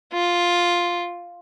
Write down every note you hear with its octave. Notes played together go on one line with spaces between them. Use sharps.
F4